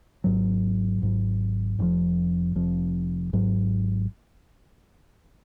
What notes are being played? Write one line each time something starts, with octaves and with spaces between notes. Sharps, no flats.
G#1 G#2 F#3
G#1 G#2 F#3
F1 F2 F3
F1 F2 F3
G#1 G#2 F#3